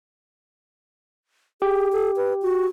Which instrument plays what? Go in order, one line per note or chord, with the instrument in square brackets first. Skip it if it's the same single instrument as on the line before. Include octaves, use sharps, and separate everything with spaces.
[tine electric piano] G4 [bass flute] G#4
[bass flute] A4
B4
F#4